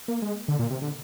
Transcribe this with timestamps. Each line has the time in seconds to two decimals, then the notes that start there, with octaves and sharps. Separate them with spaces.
0.08 A#3
0.22 G#3
0.48 D3
0.59 A#2
0.71 C3
0.82 D3